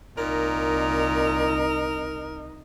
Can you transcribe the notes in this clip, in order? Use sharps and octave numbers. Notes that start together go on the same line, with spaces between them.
C2 A#2 D#4 A#4